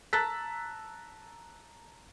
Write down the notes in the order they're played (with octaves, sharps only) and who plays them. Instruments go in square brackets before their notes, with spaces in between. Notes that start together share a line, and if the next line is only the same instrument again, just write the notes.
[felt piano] A5 A#5 E6 F#6 A6 B6